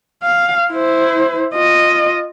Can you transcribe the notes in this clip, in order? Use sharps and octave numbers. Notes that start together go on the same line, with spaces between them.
F5
E4 C5
F4 D#5